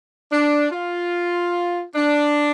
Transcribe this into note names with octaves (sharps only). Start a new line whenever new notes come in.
D4
F4
D4